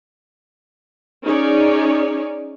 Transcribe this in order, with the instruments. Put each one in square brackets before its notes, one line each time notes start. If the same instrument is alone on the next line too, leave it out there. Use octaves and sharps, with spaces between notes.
[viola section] C#4 D#4 G#4 C#5 D5